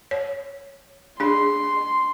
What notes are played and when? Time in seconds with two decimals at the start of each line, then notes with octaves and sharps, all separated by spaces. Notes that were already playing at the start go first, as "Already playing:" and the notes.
0.11 C#5
1.20 D4 G#4 C6